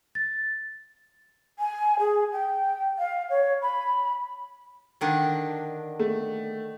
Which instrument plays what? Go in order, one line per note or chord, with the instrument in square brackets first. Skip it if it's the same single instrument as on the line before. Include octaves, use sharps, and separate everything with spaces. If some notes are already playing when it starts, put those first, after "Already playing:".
[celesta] A6
[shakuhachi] G#5
G#4
G5
F5
C#5
B5
[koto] D3 D#3 D4
[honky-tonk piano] A3